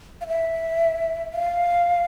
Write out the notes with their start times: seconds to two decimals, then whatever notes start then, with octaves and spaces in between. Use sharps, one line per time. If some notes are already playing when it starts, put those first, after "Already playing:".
0.21 F5
0.27 E5
1.33 F5